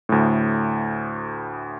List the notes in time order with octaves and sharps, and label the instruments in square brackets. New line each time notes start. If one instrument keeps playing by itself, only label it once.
[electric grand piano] D2 A2